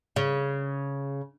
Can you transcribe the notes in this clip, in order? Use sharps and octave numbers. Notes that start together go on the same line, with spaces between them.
C#3